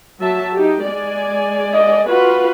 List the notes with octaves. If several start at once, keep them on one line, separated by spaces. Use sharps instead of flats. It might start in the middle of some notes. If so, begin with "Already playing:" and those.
F#3 E5 A5
D#4 G4
G#3 D5 G#5
D#5
F4 F#4 B4